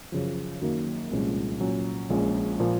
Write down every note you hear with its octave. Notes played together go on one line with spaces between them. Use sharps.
F#2 C#3 F3
F#2 D#3 F#3 A#3
C2 A#2 F3 G#3 C#4
A#2 F#3 C#4
A#1 A#2 G#3 C#4
A#2 F3 A#3